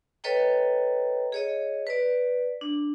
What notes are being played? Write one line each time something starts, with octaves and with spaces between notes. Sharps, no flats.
A4 B4 C#5 D#5 G5 A#5
G#4 C#5 D#5
B4 D5
D4